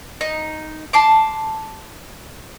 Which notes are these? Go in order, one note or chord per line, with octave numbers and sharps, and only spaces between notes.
D#4
A5 C6 D6